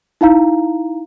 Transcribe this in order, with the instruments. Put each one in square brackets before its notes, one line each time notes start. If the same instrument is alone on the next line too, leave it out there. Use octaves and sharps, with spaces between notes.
[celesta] D#4 E4 F5 A#5